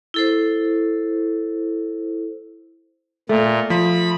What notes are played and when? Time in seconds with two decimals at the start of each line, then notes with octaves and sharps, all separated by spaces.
0.14 E4 A4 C5
3.29 A#2 A3
3.70 F3 B5